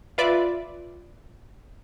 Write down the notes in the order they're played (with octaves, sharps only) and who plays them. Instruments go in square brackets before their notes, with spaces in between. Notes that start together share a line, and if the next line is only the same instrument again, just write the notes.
[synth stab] F4 B4 D5 E5